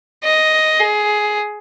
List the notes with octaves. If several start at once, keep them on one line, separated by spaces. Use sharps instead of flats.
D#5
G#4